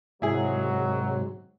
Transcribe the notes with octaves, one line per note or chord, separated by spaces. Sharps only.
G#2 C3 D#3 F#3 E4 G#4